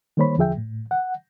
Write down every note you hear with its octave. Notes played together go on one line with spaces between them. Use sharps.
D#3 G3 A#3 C5 C#5 B5
E2 D3 F3 G#4 E5 G5
A2
F#5